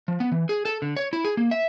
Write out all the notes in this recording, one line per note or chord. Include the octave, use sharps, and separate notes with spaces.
F3
B3
E3
G#4
A4
D3
C#5
E4
G#4
A#3
E5